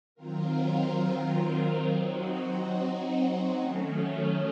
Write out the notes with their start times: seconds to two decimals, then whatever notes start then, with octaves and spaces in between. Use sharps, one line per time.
0.15 D#3 F#3 C4 F4 A#4
1.86 F#3 C4 D#4 F#4
3.57 D#3 F#3 A3 C#4